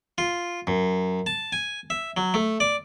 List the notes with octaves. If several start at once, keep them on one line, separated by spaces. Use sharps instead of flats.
F4
F#2
A5
G#5
E5
F#3
A3
D5